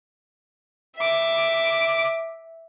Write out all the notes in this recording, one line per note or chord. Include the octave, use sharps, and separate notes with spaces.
E5 D6